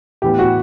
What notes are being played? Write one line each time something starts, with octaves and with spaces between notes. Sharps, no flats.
A2 E3 B3 G4
F#4